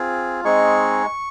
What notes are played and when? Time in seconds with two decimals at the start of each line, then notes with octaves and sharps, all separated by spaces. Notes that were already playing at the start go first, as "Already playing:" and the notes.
Already playing: C4 F4 G#4
0.44 G#3 C4 D#4 G#4 C#6